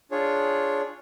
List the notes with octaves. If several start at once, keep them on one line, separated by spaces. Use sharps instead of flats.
D4 F4 G#4 C#5